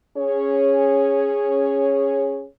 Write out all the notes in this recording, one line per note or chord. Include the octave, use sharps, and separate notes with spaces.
C#4 G#4 C#5